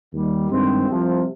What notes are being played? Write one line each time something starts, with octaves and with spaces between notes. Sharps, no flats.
D#2 D#3 G3
G2 D#3 G#3 C4
C2 C3 F3